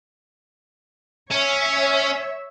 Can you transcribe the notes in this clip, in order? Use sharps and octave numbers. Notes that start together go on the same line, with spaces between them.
C#4 C#5 E5